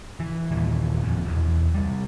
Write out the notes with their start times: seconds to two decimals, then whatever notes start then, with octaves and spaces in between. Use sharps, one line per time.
0.20 E3
0.51 D#2 A#2 D#3 E3
1.03 D1 G#1 F2
1.25 E1 E2
1.74 C2 G3